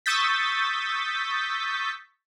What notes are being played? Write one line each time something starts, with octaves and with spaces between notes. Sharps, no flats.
C#6 D#6 E6 G6 A6 B6